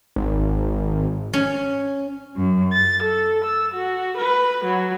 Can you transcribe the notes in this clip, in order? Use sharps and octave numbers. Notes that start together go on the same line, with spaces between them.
G#1
C#4
F#2
A6
A4
E6
F#4
B4
F#3